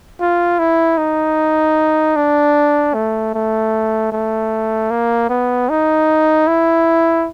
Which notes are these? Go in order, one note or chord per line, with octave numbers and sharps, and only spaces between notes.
F4
E4
D#4
D4
A3
A3
A3
A#3
B3
D#4
E4